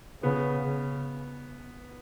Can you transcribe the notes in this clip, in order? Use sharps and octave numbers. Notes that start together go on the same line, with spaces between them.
C#3 B3
C#3